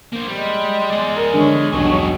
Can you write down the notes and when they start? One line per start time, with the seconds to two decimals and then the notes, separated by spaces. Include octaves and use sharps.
0.13 A#3 C5
0.28 G3 G#3
0.90 G#4 D5
1.16 A#4
1.33 D3 G#3 C#5
1.72 E1 B1 G2 F#3 G#4